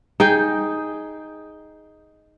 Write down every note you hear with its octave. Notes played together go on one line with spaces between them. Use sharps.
D#4 G#4 G5